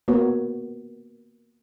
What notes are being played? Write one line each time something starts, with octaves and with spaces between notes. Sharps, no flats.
A#3 B3 F#4 C#5